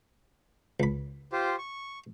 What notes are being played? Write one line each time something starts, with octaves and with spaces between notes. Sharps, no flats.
C#2 B5
F4 G4 C5
C#6